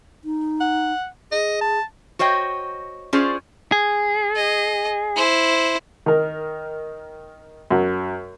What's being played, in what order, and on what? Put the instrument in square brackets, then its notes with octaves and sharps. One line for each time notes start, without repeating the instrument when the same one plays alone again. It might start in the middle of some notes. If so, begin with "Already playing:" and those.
[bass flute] D#4
[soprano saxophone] F#5
[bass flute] G#4 [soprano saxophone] D#5
[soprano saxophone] A5
[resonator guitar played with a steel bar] F#4 C5 C#5 D#5 G5
C#4 F4 G#4 C5 D5
[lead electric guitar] G#4
[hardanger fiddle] D#5
E4 C5
[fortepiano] D#3 A#4
F#2 F#3